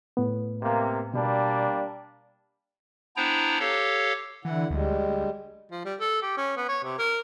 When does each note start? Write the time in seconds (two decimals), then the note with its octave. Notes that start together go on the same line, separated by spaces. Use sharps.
0.17 A2 B3
0.62 C3 A#3
1.14 B2 G3 A#3 D4
3.17 B3 D4 E4 C5 G5 A#5
3.59 G4 A4 C#5 F5
4.45 D3 E3 E4 F#5
4.70 D2 G3 G#3
5.71 F3
5.85 G3
6.00 A4
6.22 G4
6.37 C#4
6.57 B3
6.69 C#5
6.83 C3
6.98 A#4